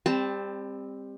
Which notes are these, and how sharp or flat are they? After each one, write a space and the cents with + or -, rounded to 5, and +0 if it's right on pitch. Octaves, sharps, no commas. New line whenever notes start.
G3 +25 C4 +0 A5 +10